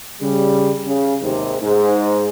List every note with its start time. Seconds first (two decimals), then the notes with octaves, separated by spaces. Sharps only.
0.21 C#3 G3
0.86 C#3
1.21 D#2 G#2 C3
1.61 G#2